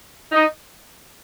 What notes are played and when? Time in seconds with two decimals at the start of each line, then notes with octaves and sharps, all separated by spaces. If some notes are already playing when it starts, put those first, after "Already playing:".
0.32 D#4 D#5